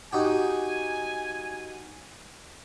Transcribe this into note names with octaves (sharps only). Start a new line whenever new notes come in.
D#4 F#4 G4 G#5